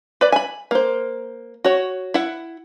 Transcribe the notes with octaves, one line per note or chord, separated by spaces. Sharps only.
B4 D5
G#5 B5
A#3 C5
F#4 C#5
E4 F#5